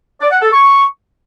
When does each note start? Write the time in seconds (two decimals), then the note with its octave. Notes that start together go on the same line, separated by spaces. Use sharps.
0.21 D5
0.31 F#5
0.42 A4
0.52 C#6